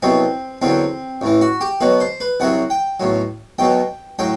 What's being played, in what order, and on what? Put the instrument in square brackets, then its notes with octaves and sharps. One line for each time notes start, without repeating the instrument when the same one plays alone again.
[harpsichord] C2 B2 F#3 C4
E2 D3 F#3 C4
A1 A2 E3
F#4
G4
B1 B2 F#3 B4
C5
B4
C2 C3 F#3 F#5
G5
B1 A2 F#3
B1 B2 F#3 G5
A2 F#3 G5